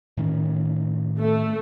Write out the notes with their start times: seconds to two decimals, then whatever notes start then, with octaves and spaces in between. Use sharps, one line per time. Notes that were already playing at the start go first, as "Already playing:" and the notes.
0.17 A2 D#3 C#4
1.20 A3